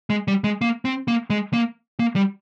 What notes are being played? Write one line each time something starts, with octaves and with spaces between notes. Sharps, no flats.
G#3
G3
G#3
A#3
C4
A#3
G#3
A#3
A#3
G3